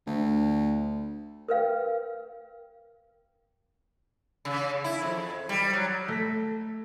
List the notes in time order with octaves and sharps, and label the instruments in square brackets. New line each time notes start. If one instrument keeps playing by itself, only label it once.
[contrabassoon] D2
[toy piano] A#4 B4 F5 G5
[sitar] C#3
E4
F2
G3
F#3
[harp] A3 A#6 B6